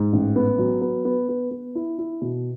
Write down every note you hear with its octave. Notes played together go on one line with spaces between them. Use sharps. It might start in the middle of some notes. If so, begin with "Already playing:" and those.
Already playing: G#2
A1
B3
F#3
B3
B3
B3
B3
E4
E4
B2